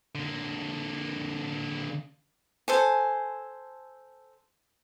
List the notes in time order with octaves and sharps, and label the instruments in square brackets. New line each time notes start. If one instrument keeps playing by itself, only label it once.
[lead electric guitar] D3 A#3
[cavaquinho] A4 C5 G#5